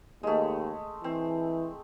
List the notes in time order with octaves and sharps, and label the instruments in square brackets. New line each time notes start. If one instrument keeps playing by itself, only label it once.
[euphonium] D#2 [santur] G#3 A3
[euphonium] E3 [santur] C4